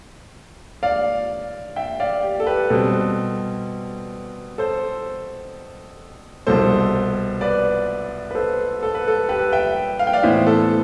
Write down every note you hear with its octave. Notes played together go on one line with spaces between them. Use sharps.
D5 F5
E5 G5
D5 F5
G4
A4
G4 B4
B2 G3 C4 A4
A4 C5
C2 B2 G3 A4 C5
B4 D5
B4
A4 C5
A4
B4
A4
G4 B4
E5 G5
F5
G5
D5 F5
A2 E3 B3 C5 E5
A4